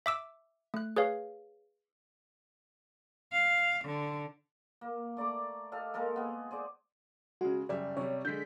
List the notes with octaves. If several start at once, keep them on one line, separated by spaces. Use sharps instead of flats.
E5 D6 E6
A3 F#6
G#4 B4 C#5 F5
F5
D3
A#3
A3 D5 A#5 D6
G4 A4 D#5 F5
G#3 A#3 A4 A#4
B3 G#4
G#4 C5 D5
C#3 G#3 F#4
F#1 G3 D5 E5
C3 G3 C#5
D3 G#3 G6 B6